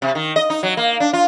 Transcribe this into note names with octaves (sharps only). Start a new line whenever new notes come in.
C3
D#3
D#5
D#4
F#3
A#3
D4
F4